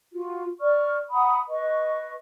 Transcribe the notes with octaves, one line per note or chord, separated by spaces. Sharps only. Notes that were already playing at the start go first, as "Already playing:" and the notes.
F4 F#4
D5 C#6 F6
F#5 A#5 B5 D#6
B4 D#5 C#6